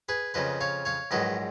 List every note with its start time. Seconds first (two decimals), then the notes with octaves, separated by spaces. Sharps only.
0.09 G#4 B4
0.34 F2 C#3 F3 B4 D#5
0.61 C#5 F5
0.85 C#5 F5
1.11 A#1 G#2 D#3 F#3 B4 D#5